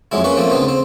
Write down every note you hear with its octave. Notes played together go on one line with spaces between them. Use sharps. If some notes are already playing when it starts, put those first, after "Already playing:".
F2 F#3 G#3 E4
A#3 C#4 B4 C#6
F3 A3 A#3 C4
D2 C#3 B3 C4
C4